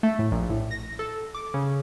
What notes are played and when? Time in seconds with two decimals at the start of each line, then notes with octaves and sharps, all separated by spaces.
0.03 A3
0.19 A2
0.32 A#1
0.49 A2
0.71 A#6
0.99 A4
1.34 D6
1.54 C#3